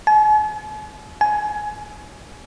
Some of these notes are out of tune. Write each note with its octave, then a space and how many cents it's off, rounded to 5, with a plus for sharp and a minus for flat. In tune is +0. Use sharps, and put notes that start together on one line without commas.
G#5 +45
G#5 +15